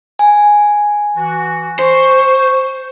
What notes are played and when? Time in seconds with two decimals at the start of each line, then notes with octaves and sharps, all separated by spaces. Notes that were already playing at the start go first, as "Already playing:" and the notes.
0.19 G#5
1.16 E3 F#4
1.79 C5 C#6